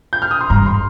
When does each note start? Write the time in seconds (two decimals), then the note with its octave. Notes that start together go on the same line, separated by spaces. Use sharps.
0.13 G6
0.22 F6
0.31 D#6
0.41 C6
0.50 G2 A#5
0.66 C6